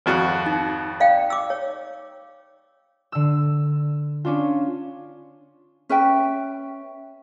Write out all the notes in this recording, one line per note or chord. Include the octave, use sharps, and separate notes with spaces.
G#1 F2 F#4
D#4
D5 F5 G5
D6 E6
C#5
D3 E6
C#4 D4 F4
C#4 B4 E5 G5